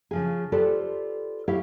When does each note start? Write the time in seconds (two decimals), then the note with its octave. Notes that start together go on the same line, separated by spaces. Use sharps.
0.11 C#3 F3 G#4
0.52 F4 G4 A4 B4 C5 D5
1.48 E4 G4 C#5 E5 F5